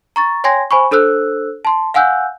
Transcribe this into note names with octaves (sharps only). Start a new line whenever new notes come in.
A#5 C#6 A6
C#5 G5 G#5 C6 G#6 A#6
C5 G#5 B5 C#6
D4 A4 C5 E6 F#6
A5 C6
F5 F#5 G#5 E6 F#6 G6